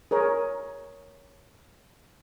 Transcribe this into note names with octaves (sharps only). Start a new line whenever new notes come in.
G#4 A#4 C#5